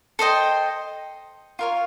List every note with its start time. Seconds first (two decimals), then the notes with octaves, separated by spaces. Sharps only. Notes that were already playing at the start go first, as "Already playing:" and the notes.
0.19 A4 C5 D#5 G5
1.59 F4 A#4 C#5